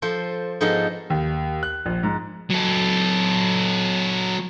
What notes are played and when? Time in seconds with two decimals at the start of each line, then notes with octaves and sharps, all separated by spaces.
0.02 F3 A4 C5
0.61 G#2 F3 G#3 B3 D#4 A4
1.10 D#2
1.63 F#6
1.86 A#1
2.03 G#2
2.50 F#3 A4